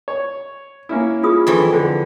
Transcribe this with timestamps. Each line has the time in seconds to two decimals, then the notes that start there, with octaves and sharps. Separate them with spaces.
0.08 C#5
0.89 A#3 C#4 E4
1.23 F4 G#4 D#6
1.47 F2 D#3 E3
1.73 D3